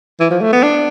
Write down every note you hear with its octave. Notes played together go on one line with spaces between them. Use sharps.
E3
F3
A3
B3
D4